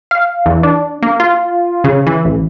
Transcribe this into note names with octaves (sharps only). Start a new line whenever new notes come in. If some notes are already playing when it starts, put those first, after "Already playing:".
F5
E2
D4
A#3
F4
C#3
E3
A1